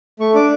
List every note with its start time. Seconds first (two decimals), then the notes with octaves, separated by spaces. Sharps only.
0.20 A3 C#6
0.34 D4 D6